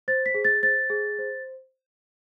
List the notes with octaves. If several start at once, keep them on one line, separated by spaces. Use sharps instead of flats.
C5 A6
B6
G#4
A6
C5 A6
G#4
C5